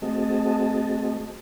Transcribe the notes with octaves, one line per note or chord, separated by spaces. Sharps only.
A3 C4 F#4 G#4 D#5 A5